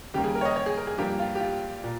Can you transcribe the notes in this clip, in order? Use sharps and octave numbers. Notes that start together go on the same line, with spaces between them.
D#2 C#3 G3 A#3 G4
G#4
A#4
C#5
D#5
C#5
G#4
A#4
G#4
G2 F3 A#3 G4
F4
G4
F4
A#2